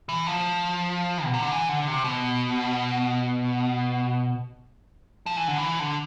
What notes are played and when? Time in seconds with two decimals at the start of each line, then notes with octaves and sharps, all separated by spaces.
0.09 E3
0.27 F3
1.24 B2
1.34 C3
1.42 D3
1.51 E3
1.69 D3
1.88 C3
2.04 B2
5.26 F3
5.37 E3
5.48 D3
5.58 E3
5.79 D3